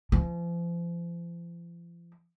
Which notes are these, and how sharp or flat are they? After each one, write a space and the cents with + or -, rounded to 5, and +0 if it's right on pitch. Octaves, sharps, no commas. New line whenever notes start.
F3 -40